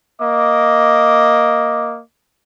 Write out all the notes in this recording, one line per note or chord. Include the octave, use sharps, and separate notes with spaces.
A#3 D#5 D6